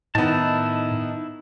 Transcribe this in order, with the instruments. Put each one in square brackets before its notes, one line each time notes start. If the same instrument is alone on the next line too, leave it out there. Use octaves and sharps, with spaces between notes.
[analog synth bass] A2 [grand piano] D#3 B3 [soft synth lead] D#4 [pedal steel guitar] E4 A5